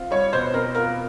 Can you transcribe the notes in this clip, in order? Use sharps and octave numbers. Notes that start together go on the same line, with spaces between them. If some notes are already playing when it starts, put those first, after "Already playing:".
Already playing: C4 F4
G3 C#5
B2 C5
C4 A#4
F4 A#4